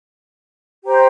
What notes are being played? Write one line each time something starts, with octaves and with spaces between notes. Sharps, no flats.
G4 C5 G5 A#5